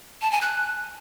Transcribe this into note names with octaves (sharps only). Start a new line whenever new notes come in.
A5
G#5
F#6